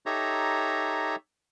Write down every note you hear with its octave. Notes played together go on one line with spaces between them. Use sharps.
D#4 G4 A4 C#5 E5 A#5